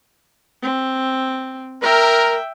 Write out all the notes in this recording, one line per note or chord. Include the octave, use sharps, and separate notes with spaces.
C4
A#4 E5 G5